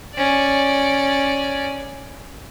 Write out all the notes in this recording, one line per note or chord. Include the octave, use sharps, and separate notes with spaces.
C#4 D5